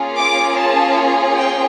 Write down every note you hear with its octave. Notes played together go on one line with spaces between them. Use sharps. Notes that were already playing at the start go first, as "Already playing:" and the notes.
Already playing: A#3 C#4 F4 G#4
D6
A5
G5